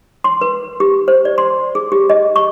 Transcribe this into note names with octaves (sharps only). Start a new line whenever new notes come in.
C6
B4
G4
C5
D5
C6
G#4
G4
D#5
C#6